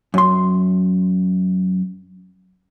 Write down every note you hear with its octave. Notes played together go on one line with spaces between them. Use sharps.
F#2 C6